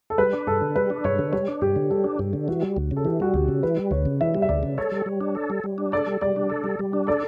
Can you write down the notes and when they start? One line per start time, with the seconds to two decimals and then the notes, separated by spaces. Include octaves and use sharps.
0.10 A4
0.18 G3 B4
0.33 D4
0.47 G2 A4
0.61 D3
0.75 G3 B4
0.90 D4
1.04 G2 C#5
1.19 D3
1.32 G3 C#5
1.48 D4
1.62 G2 G4
1.76 D3
1.90 G3 A4
2.04 D4
2.19 G2 G4
2.33 D3
2.48 E3 F#4
2.62 G3
2.77 D2
2.91 C#3
2.96 A4
3.05 E3 G4
3.20 G3 F#4
3.34 D2 G4
3.48 C#3
3.63 E3 B4
3.77 G3
3.91 D2 C#5
4.06 C#3
4.21 E3 E5
4.35 G3
4.42 E5
4.49 D2 D5
4.63 C#3
4.78 A4 C#5
4.92 G3
5.06 G3
5.20 D4
5.35 A4
5.50 G3
5.64 G3
5.78 D4
5.92 A4 D5
6.07 G3
6.21 G3 D5
6.36 D4
6.50 A4
6.64 G3
6.79 G3
6.93 D4
7.07 A4 D5